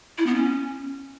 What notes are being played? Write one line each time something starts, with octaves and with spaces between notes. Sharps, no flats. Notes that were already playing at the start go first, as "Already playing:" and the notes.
E4
B3
C#4